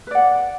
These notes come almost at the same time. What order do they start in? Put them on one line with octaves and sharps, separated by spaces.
B4 D5 F#5